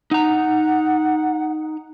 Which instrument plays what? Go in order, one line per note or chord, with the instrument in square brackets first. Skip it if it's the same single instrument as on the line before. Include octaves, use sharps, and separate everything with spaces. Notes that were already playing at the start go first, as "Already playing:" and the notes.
[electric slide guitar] D#4 A#5 [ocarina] F#5